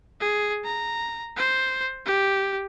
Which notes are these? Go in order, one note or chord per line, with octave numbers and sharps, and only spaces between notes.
G#4
A#5
C5
G4